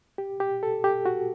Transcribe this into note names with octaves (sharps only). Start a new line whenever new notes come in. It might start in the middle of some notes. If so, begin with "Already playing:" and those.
G4
G4
A4
G4
F#4